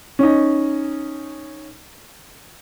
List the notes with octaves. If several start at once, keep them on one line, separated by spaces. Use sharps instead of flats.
C#4 D#4